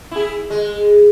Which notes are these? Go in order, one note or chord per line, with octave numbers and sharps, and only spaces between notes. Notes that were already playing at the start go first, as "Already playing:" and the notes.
E4 G#4
G#3